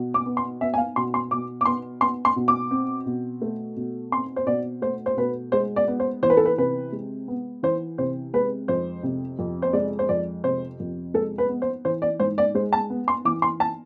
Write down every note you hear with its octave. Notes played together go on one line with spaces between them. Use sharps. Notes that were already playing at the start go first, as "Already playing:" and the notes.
Already playing: B2
D6
B3
C6
B3 E5
G#5
F5
B2 C6
C6
B2 D6
D6
B3 C6
B3 C6
C6
B2
D6
C4
B2
A3
B2
C4 C6
C5
B2 D5
A3 C5
C5
B2 B4
G#3 C5
D5
B3
C5
E3 C5
B4
A4
B4
C3 B4
G#3
B3
E3 C5
C3 C5
G#3 B4
F2 C5
C3
F2
C5
G#3 D5
C5
F2 D5
C3 C5
F2
G#3 A4
B4
B3
C5
E3 C5
D5
G#2 C5
D5
G#3 C5
A5
B3
C6
E3 D6
C6
A5